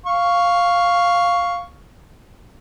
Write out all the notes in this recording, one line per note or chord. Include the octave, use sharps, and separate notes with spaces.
F5 C#6